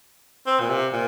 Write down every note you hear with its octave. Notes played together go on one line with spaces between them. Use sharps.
C4
A#2
C3
A#2